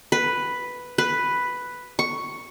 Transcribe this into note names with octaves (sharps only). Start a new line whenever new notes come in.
B4
B4
C#6